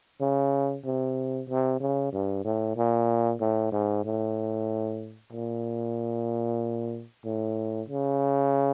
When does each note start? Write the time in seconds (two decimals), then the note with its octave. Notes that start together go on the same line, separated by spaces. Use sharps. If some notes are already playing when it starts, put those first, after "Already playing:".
0.20 C#3
0.85 C3
1.49 C3
1.80 C#3
2.12 G2
2.44 A2
2.76 A#2
3.40 A2
3.72 G#2
4.05 A2
5.32 A#2
7.24 A2
7.89 C#3